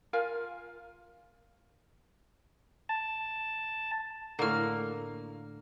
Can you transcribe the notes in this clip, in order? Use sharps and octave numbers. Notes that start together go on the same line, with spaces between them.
F4 A#4 F5 G#5
A5
A2 D3 A#3 F6